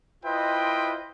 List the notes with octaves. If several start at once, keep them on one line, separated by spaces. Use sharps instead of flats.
E4 F4 B4 C5 D#5 G5